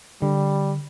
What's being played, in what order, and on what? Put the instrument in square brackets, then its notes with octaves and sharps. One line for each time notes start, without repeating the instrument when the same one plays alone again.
[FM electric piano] D3 [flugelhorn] G3